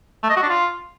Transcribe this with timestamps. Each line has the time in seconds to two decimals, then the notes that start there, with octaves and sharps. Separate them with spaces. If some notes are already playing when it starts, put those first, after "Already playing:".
0.23 A3
0.30 D#5
0.36 F#4
0.43 D4
0.49 F4